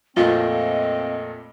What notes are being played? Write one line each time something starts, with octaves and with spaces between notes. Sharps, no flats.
F2 A#2 A3 C4 F4 D#5